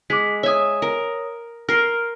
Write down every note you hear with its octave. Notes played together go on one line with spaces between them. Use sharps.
G#3 D6 B6
C#5 E5 G#5 D#6
A#4
A#4 C6 F6